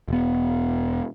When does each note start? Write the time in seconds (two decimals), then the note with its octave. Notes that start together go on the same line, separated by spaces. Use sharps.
0.08 E1 B3